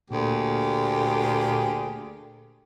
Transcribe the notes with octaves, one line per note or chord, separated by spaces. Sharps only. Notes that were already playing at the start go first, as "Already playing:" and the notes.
D2 A#2 A#3 G4 G#4